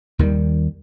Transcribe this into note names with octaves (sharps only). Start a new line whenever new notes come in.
D#2 D#3 E3 G3